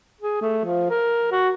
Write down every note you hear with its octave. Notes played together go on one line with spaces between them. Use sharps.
G#4
A3
F3
A#4
F#4